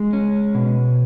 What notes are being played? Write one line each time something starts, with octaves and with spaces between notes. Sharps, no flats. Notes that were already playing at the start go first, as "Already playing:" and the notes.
Already playing: G#3
C#4
B2